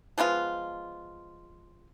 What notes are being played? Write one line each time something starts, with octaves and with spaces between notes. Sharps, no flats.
F3 G#3 B3 F4